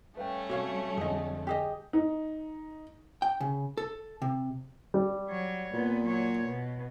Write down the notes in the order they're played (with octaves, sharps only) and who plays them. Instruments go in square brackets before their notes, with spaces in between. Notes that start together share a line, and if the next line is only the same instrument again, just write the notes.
[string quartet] G3 A3 C#4 [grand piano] B4 F5 G5
[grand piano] C3 [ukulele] F#4 C#5 F5
[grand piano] F2 D3 [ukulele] G#4 D#5
[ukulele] G4 G#4 D#5
[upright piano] D#4
[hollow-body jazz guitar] G5
C#3
A4
C3
[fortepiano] G3
[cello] F#3 C#5
[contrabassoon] A#2 [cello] B3
[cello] F#3 C#5
B2